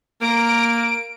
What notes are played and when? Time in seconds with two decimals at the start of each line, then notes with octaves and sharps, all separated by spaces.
0.21 A#3 A#4 D7